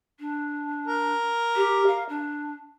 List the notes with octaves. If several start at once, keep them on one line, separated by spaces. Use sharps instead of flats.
D4
A#4
G4
F5
D4